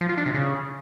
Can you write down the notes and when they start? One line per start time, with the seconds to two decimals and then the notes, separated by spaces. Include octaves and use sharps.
0.01 F3
0.09 F4
0.17 D4
0.26 C3
0.34 C#3